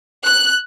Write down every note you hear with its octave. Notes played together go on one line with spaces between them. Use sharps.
F#6